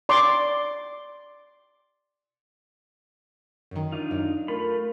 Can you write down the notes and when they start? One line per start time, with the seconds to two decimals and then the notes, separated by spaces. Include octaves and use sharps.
0.09 D5 C6 D6
3.71 F#2 D#3
3.92 D4 D#4 F4
4.11 F#2
4.48 A3 F4 A#4 B5